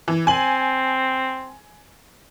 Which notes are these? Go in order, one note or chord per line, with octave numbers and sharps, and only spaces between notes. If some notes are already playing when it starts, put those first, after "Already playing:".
E3
C4 G#5 F#7